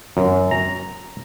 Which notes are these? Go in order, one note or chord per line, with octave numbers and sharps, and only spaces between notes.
F#2
A#5